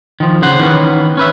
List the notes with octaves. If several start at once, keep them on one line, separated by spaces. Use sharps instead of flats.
D#3 F3
C#3 C5 F#5
D#3 E3 B3 C#4
C#4 B4 E5